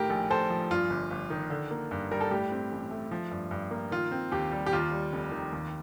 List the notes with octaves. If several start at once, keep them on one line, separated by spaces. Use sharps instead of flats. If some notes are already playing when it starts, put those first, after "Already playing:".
Already playing: A2 D#3 G4 A#4
A#1
A#1 A4 C5
F3
G2 F4
G1
G1
D#3
D3
A#3
G2
G3 A#4
A4
A2 G4
C4
A1
A3
F3
G2
G2
A#3
D#3 F4
C4
D#2 G4
G3
G4
D#2 F4
G3
F1
D#3
D#2